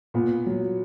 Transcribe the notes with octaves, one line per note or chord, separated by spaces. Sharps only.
A#2 B3
F#3